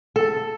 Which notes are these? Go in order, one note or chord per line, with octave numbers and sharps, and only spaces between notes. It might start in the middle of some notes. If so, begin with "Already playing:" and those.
A4